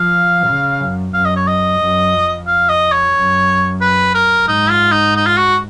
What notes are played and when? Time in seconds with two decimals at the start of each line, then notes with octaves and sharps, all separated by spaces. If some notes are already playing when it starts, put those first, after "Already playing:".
Already playing: F3 F5
0.47 C#3
0.80 F#2
1.14 F#2 F5
1.25 D#5
1.36 C#5
1.48 D#5
1.80 F#2
2.14 F2
2.47 F5
2.69 D#5
2.92 C#5
3.14 F#2
3.81 B4
4.15 A#4
4.48 G#2 D#4
4.70 F4
4.92 D#4
5.16 D#4
5.26 F4
5.37 F#4